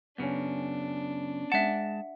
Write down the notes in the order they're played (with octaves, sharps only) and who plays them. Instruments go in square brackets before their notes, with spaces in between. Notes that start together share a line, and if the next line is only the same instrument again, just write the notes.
[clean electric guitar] F#2 C#3 [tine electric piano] B3 C#4 [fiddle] D4
[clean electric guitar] G#3 A5 [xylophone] E5 F#5